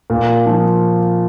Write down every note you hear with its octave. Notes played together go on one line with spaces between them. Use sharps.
A#2
F3